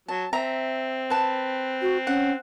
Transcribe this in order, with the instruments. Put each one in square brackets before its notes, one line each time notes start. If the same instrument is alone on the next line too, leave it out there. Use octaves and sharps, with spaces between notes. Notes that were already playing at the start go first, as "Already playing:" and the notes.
[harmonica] F#3 [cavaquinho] A5
[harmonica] C4 [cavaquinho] E5 A#5
[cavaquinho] B4 A5
[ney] F#4
[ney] C#4 [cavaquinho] F#5